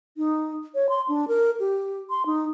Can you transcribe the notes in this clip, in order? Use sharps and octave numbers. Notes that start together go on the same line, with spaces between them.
D#4
C#5
C6
D4
A#4
G4
C6
D#4